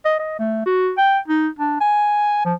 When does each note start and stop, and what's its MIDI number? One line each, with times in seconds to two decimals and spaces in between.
0.05 0.19 75
0.19 0.36 75
0.39 0.66 57
0.66 0.92 66
0.98 1.19 79
1.28 1.48 63
1.59 1.77 62
1.81 2.42 80
2.45 2.54 53